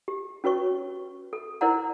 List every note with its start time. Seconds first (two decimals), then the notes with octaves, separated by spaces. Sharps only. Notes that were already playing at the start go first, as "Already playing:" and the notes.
0.08 G4
0.44 C#4 F#4 B4 C#5 C#6
1.33 A4
1.61 E4 A#4 C5 D5 F#5 A#5